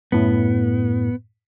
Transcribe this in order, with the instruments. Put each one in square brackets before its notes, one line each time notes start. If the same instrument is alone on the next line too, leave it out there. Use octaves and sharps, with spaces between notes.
[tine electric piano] F#2 A2 [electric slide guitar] B3